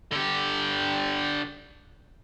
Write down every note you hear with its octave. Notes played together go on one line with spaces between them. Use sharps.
D3 G4